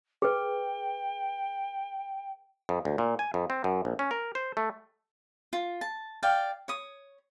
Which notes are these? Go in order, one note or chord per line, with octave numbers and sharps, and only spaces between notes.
G#4 B4 G5
F2
D2
A#2
G#5
F2
C4
F#2
A#1
C#4
A#4
C5
A3
F4
A5
D5 F5 G5
C#5 D#6